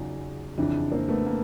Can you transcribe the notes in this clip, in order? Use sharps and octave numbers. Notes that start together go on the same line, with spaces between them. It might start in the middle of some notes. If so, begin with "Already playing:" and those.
Already playing: E2 C#3 F#3 D#4 F4
F2 C#3 E3 D4 E4
A#3 C4
A3 B3
A#3